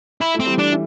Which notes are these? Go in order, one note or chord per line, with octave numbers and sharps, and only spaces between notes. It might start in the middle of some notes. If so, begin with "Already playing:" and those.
E4
A3
C4
E3 G3
D4
E3